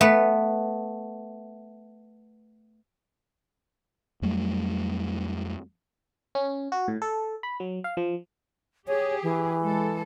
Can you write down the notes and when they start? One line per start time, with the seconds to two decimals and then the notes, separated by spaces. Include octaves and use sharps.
0.01 A3 B3 B4
4.22 F2 F#3 G3 A3
6.35 C#4
6.72 F#4
6.88 A2
7.02 A4
7.43 B5
7.60 F#3
7.84 F5
7.97 F3
8.87 G4 G#4 C#5
9.23 E3
9.61 G#3 A4